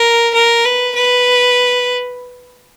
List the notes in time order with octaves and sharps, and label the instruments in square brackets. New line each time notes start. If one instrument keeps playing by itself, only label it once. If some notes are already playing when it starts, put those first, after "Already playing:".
Already playing: [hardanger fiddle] A#4
A#4
B4
B4